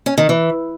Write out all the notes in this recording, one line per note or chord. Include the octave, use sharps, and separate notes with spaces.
C#4
D#3
E3